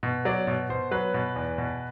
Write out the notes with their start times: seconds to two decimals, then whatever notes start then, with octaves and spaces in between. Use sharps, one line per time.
0.03 B2
0.25 F#3 D5
0.47 B2
0.70 B2 C5
0.91 F#3 B4
1.14 B2
1.36 E2
1.58 B2